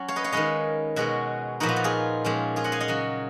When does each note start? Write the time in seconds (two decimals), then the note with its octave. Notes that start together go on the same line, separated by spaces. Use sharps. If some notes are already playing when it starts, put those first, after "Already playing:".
Already playing: F#3 C#4
0.08 C#5 F5
0.16 B4 D#5
0.24 C#5 F5
0.32 D#3 G#3 C#4 B4 D#5
0.96 B2 G#3 C#4 F#4
1.60 A#2 F3 B3 D#4 F#4
1.69 F4
1.76 F#4
1.84 F4 G#4
2.25 A#2 F3 G#3 C#4
2.56 F4 G#4
2.64 D#5 F#5
2.72 F5 G#5
2.80 D#5 F#5
2.88 C#3 F#3 C#4